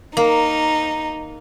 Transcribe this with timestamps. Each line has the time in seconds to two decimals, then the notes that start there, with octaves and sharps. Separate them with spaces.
0.17 A#3 D#4